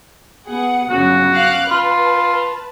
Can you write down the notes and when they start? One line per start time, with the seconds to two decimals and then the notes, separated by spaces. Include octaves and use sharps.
0.47 B3 G#4 F#5
0.90 G1 C#3 F#3 F#4
1.34 F5 D6 F#6
1.71 F4 B4 A5